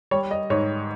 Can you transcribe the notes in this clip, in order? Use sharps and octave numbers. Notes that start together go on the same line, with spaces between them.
G3 C#5
D#5
G#2 C#5